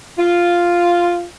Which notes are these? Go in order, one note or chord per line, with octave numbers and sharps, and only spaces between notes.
F4